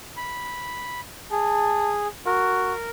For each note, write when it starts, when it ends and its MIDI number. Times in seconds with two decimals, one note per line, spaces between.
0.17 1.01 83
1.31 2.08 68
1.31 1.93 81
2.26 2.73 66
2.26 2.90 70